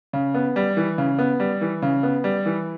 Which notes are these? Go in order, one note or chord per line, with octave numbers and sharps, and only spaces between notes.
C#3
B3
G3
E3
C#3
B3
G3
E3
C#3
B3
G3
E3